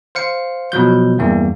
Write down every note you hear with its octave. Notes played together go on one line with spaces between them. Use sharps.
C5 F5 C#7
B2 F3 F#3 G6
E2 G2 A#3